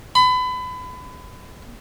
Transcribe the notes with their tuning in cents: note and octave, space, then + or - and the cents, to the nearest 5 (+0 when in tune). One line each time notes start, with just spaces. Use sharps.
B5 +30